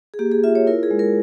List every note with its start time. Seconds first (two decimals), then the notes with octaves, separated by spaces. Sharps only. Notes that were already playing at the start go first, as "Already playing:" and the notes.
0.14 G#4
0.19 A#3 G4
0.32 G#4
0.44 F4 E5
0.55 C#5
0.67 E4 A#4
0.83 G#4
0.91 G#3
0.99 A#4